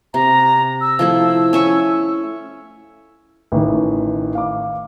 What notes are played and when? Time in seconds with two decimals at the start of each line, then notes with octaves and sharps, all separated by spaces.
0.14 C3 A#5
0.81 E6
0.99 F3 A3 E4
1.53 C#4 E5 C#6
3.52 A1 D#3
4.35 F5 D6